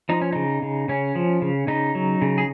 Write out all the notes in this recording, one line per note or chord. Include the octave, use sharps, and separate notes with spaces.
F3 D#4
C#4
C#3 D#4
C#3
C#3 C#4
F3
C#3
C#3 D#4
F#3
C#3
G#4